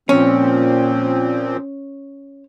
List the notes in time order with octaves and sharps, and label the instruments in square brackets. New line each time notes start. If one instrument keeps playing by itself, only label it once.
[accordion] A#2 F3 C4 [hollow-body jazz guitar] C#4